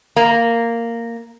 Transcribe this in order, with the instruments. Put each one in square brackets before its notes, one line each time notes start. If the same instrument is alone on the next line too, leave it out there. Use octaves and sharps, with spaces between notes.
[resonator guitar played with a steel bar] A#3